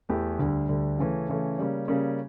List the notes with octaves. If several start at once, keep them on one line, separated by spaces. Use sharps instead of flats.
E2 E3 A3 E4 G4
D2 D3 G3
D2 D3 G3
C#3 E3 A3 C#4
C#3 E3 A3 C#4
C#3 G3 A#3 C#4
C#3 G3 A#3 C#4